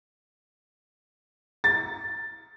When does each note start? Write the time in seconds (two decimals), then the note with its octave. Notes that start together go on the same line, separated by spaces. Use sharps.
1.64 A6